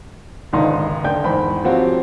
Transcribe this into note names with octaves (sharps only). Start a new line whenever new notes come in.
G#1 C#2 D3 D#4 C6
D#1 D3 G5 G6
E2 G#2 C5 B5
F3 F#3 C4 F#4 G4